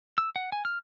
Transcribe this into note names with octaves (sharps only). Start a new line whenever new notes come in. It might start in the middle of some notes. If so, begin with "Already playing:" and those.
E6
F#5
G#5
F6